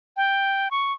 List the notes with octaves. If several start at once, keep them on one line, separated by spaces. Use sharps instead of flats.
G5
C#6